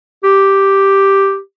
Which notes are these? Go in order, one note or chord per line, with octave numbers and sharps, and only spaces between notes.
G4